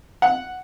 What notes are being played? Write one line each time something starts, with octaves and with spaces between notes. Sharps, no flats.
F#5